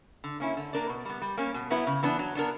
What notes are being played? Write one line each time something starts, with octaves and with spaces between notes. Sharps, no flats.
D3
A#3 C#4 E4
D3
A#3 D4 A#4 D5
B2
G3 B3
G3
A#3 C#4
B2
F#3 B3 E4 B4
C#3
E3 B3 D4
F#3
B3 D4 A#4